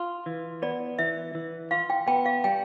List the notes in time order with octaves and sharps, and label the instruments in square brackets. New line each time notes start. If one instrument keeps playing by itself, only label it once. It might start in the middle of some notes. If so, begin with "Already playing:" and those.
Already playing: [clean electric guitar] F4
E3
[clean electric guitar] B3 [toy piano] D5
[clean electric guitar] E3 [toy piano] E5
[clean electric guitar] E3
[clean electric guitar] F4 [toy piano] F5
[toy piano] G5
[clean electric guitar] B3 [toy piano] G5
[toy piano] F5
[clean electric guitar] G3 [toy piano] G5